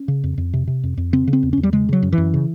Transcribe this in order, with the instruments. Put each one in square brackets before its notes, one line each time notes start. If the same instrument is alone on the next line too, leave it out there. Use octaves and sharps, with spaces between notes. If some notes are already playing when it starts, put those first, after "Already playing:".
Already playing: [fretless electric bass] C#4
C#3
F2
F2
C3
C3
F2
F2
C#3 C4
C#3
C4
E2
E2 C#4
G3
C#3 G#3
C#3 F#3
F#2
E3
F#2
C#3